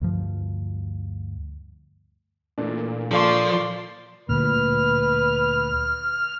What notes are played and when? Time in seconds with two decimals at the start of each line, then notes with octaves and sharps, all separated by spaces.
0.01 D2 G2 F3
2.58 A#2 E3 A3 D4
3.11 F3 A4 D5 F5 C6 C#6
4.29 D2 A#2 B4 F6